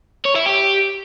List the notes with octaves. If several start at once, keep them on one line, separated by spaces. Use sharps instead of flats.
C#5
E4
G4